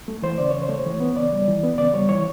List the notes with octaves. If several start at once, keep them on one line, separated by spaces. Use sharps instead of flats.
A3
E3 C5
C#3 D5
C#3 C#5
C5
A3
C#5
E3
B3
C#3 D5
G3
E3
B3
C#3 D5
G3 C#5
E3 C#5